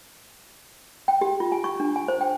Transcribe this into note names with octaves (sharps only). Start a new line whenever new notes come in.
G5
G4
F4
G#5
C#6
D4
G#5
C5
G5